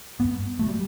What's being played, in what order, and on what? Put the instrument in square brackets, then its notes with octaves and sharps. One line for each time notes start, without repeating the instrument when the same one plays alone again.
[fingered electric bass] G2 [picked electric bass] B3
[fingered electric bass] F#3 [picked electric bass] A3
[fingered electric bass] B3
[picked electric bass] G3